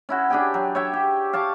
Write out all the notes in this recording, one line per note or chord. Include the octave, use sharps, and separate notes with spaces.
C#4 E4 F#4
D4 G4 G#4 G5
F#3
C#5 E5 G5
G4
F5 A5 C#6 D6